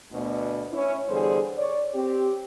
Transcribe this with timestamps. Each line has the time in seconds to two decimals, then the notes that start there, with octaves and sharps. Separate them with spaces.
0.13 D2 B2
0.73 C#4 E4
1.09 E2 D3 G3 G#4 C5
1.58 C#5 D5
1.95 C4 G4